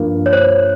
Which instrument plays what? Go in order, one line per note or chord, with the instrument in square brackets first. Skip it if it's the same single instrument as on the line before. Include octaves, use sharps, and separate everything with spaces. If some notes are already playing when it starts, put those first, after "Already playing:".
Already playing: [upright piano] G2 F3 A#3
[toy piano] C#5
C5